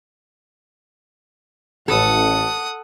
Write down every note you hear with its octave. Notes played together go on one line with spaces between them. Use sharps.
A1 A4 F#5 D#6